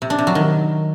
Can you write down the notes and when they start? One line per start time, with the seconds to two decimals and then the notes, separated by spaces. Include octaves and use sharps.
0.02 C3
0.10 D4
0.19 C3
0.27 F#3
0.35 D#3